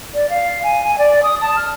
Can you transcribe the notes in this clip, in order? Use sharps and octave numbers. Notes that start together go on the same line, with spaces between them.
D5
F5
G#5
G#5
D5
D#6
A5
F6